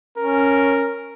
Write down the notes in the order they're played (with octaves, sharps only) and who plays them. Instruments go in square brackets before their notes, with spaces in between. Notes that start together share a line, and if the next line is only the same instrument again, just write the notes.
[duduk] C#4 [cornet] A#4